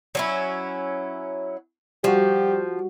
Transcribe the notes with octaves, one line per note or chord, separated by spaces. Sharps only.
F#3 C#4 E4
F3 G3 F#4 G4